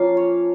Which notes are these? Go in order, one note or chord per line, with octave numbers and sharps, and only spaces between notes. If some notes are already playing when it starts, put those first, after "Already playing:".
Already playing: F3 A#3 C#4 F4 F5
C#5